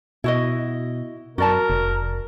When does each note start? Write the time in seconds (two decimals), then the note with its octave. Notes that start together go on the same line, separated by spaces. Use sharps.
0.24 B2 E4 F#4 D#5
1.38 F#2 F#4 A#4 D5 A5
1.70 F1